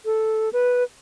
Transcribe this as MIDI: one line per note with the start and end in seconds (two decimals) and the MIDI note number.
0.05 0.49 69
0.53 0.84 71